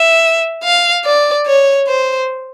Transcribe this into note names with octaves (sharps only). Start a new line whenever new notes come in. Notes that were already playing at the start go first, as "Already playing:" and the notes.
Already playing: E5
F5
D5
C#5
C5